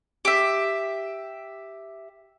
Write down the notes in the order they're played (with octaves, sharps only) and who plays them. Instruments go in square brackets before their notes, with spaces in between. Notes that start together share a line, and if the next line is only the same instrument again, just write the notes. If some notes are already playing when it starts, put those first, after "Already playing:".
[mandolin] G4 E5